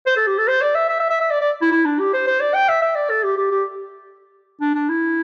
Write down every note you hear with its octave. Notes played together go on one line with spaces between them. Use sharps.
C5
A4
G4
A4
C5
D5
E5
E5
E5
E5
E5
D5
D5
E4
E4
D4
G4
C5
C5
D5
G5
E5
E5
D5
A4
G4
G4
G4
D4
D4
E4